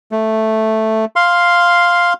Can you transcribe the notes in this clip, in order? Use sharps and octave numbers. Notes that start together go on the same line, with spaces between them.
A3
F5 C6